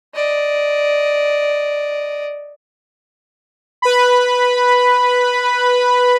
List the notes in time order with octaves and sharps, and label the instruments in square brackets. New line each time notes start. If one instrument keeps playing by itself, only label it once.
[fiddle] D5 D#5
[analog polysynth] B4 B5